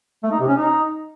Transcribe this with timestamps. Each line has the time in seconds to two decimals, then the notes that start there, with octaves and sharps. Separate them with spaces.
0.23 A3
0.32 D#4
0.40 C3
0.48 C#4
0.57 D#4